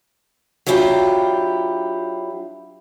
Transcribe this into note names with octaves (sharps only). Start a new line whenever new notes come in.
F#3 D4 E4 F4 G4